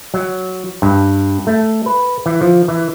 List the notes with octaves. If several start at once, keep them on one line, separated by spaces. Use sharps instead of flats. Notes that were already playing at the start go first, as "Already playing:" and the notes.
F#3
G2
A3
B4
E3
F3
E3